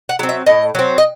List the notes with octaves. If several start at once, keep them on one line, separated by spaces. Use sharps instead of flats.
F#5
F#3 C4
E5
A2 D#5
F#3 C4
D#5